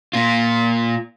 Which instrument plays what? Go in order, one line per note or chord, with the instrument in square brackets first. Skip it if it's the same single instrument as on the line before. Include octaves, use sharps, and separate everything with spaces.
[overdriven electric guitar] A#2 F4